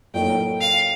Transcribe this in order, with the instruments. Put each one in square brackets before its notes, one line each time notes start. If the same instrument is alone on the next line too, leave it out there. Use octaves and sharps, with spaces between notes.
[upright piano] A2 F#3 A#3 D#4 [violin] G5
[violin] F5